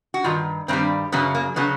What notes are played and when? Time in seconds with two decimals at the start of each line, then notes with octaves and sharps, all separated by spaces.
0.14 F#4
0.24 G2 D#3 F4
0.68 G2 D#3 G3 C4
1.12 F#2 C#3 F#3 B3
1.35 A#3
1.56 C#3 F#3 B3